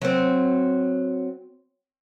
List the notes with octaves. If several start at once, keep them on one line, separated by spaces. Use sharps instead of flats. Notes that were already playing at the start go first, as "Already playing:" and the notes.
F#3 C4